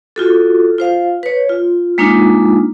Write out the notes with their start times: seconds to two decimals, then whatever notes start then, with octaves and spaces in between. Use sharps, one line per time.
0.16 F4 F#4 A4
0.78 F4 C5 F5
1.23 B4 C#5
1.49 F4
1.98 G#3 A#3 D4 D#4 F4